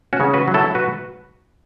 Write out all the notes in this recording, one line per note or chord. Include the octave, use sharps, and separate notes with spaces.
C#4 F#4
C#3
F#4 B4
F#3
E4 A4
F#4 B4